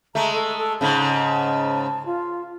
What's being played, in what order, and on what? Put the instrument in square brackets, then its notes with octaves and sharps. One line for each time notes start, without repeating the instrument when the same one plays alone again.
[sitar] G#3 A3 [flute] A#5
[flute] A4
A4
[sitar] G#2 C#3 [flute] A5
[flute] F4